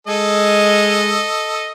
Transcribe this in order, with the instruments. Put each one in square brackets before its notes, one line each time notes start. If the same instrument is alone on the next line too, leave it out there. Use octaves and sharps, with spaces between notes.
[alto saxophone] G#3 [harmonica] A4 D#5